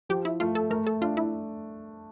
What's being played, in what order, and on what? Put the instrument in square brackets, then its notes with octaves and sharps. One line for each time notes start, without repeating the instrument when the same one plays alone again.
[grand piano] F3 [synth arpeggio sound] G4
[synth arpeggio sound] E4
[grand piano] A3 [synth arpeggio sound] F4
[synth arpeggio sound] A4
[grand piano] A3 [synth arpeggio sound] A#4
[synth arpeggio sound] A4
[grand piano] D4 [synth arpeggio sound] F4
[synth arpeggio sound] E4